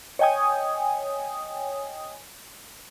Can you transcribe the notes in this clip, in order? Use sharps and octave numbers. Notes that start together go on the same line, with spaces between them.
C#5 D#5 G5 G#5 D#6